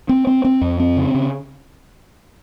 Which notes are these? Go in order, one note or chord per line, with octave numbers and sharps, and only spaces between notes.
C4
C4
C4
F2
C4
C#3
C#3